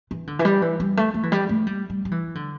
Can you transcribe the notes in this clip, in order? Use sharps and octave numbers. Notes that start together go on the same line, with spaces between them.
E3
D3
E3
G3
E3
G3
A3
A3
E3
G3
A3
G3
G3
G3
E3
D3